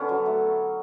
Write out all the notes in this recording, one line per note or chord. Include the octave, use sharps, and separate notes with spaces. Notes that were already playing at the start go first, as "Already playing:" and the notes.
Already playing: D3 B3 C#4
F#3
A3